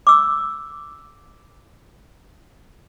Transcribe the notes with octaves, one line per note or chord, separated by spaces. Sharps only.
D6 E6